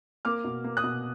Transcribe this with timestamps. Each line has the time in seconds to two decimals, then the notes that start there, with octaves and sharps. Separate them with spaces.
0.25 A#3 D6 F6
0.44 B2
0.64 A#3
0.77 D#6 F#6
0.83 B2